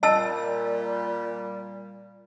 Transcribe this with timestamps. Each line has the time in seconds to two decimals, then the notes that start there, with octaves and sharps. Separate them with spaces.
0.03 A#2 G3 D#5 A5 E6